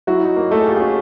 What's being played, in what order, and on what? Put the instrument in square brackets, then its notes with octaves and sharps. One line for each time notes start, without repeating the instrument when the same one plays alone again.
[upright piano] F#3 [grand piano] E4 F#4
[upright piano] D#4
A#3
[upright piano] A3 [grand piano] A4
[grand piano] G#4
[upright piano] F4 [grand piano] G4
[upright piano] C#4 [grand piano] F#4 G#4